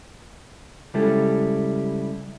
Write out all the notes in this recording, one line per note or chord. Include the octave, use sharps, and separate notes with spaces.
C#3 G3 G#3 E4 G4 A4